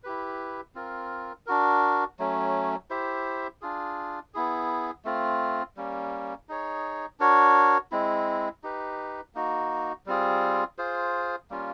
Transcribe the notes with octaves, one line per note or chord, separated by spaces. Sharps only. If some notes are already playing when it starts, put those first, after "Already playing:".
E4 G4 B4
C4 F4 A#4
D4 F#4 A#4
F#3 A3 C#4
E4 G4 C5 E5
D4 F4 G#4
B3 E4 G#4
A3 C4 F4
G3 A#3 C#4
D#4 G#4 C#5
D4 F#4 A#4 C#5
G#3 C4 E4
D#4 G4 B4
A#3 D#4 F#4
G3 C4 F4 G#4
F4 G#4 C5
G3 A#3 C#4 F4